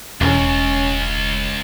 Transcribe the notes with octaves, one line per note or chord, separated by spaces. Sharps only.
E1 C#2 C#4